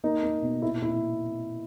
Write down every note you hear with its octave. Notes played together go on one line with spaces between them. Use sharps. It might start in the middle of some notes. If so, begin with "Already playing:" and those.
A#3 D#4
A#3
B2
A#2 E4
A#2 E4